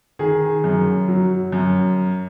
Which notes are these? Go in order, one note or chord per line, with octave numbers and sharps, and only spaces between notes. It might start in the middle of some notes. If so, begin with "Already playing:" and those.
D#3 G#4
F#2
F#3
F#2